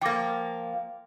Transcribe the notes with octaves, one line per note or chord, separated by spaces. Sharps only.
F3 A#3 G5 D6 A#6